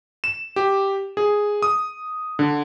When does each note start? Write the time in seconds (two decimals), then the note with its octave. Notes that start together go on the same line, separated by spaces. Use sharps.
0.24 E7
0.56 G4
1.17 G#4
1.62 D#6
2.39 D3